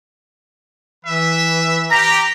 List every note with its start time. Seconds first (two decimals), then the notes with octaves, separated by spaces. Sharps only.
1.05 E3 B4 E5
1.90 G4 A#5